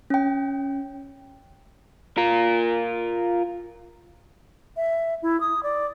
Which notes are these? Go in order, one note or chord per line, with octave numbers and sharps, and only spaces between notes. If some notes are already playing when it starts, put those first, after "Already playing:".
C#4 G5
F4 A#4
E5
E4
D#6
D5